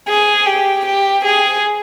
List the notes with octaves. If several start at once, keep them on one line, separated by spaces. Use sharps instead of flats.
G#4
G4
G4
G#4